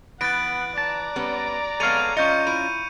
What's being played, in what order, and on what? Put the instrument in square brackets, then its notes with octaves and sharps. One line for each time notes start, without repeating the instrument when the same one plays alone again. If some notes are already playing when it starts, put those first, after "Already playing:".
[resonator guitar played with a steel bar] E3 [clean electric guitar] B3 [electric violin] F#5 [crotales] F#6 A6 D7
[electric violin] D5 A#5 [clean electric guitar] A5
[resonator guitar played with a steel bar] G3 B3 C#4
[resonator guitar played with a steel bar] G#3 B3 [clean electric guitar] A4 C#5 F5 [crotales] D#7 F7
[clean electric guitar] C#4 F4 [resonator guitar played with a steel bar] D#5 [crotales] C#6 G6 C#7
[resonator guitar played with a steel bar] E4 [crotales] D#7